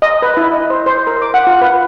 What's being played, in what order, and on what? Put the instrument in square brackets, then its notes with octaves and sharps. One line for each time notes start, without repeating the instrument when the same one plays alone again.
[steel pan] D#5
B4
E4
D#5
C5
C5
A#4
D6
F#5
F4
B4